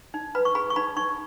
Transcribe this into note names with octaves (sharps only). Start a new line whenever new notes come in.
D#4
B4 B5
C#6
G#4 B5
C#6
D#4 B5
D#4 C#6